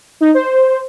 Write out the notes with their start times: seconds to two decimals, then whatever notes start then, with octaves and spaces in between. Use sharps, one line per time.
0.21 D#4
0.34 C5